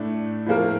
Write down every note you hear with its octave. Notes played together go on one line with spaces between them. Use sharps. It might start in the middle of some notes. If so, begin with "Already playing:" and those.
Already playing: A2 A3 D4
A2 F3 A#3 F4 A#4